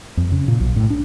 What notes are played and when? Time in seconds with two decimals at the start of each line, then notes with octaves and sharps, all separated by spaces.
0.17 F2
0.32 C#3
0.48 A#2
0.60 B1
0.76 A2
0.90 D4